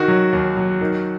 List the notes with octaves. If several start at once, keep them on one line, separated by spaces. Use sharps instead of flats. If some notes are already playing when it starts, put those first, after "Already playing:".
Already playing: D#3 F#4
F#3
D#2
F#3
D#3